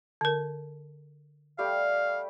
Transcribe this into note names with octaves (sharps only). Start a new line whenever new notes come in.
D3 A#4
G3 A3 G4 F5